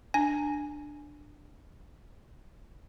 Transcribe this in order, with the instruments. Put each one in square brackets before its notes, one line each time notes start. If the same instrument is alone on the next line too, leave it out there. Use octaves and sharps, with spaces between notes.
[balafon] D4 [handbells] G#5